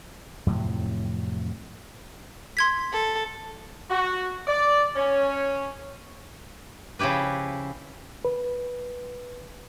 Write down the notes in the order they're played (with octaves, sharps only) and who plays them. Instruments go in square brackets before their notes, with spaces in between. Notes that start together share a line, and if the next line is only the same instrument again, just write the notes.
[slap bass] F2 A2 C3 F#3
[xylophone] C6 G#6 B6
[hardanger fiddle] A4
[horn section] F#4
D5
C#4
[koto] C#3 F3 E4 G4 B4
[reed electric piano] B4